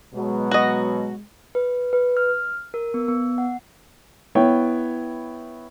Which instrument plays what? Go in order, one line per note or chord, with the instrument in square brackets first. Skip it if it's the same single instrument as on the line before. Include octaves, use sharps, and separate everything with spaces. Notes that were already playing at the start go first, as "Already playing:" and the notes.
[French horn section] B2 F#3 [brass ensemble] G#3
[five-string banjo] F#4 D#5
[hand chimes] B4
B4
F6
A#4
B3
B3
F#5
[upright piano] B3 E4 C#5 G5